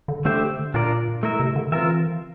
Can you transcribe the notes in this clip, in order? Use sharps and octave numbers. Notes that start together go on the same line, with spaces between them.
D3
D3 A3 D4 G4 C5 E5
A#2 D4 F4 A#4 D5
A3 E4 A#4 E5
C3
D3
E3 C4 F4 A#4 E5